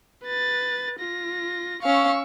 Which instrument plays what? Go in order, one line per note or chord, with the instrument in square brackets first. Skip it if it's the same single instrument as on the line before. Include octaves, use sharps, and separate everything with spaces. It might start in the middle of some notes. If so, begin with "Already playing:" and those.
[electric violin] B4 A6
F4 A#6
[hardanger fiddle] C#4 F5 [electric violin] C#6 E6